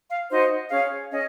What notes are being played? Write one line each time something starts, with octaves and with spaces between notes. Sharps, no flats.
F5
D#4 F#4 C5 D#5
C#4 G#4 C#5 F5
C#4 G#4 C#5 D#5